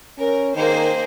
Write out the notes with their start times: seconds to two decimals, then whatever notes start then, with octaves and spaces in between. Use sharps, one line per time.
0.19 C#4 A#4
0.55 D#3 A#3 G#4 C5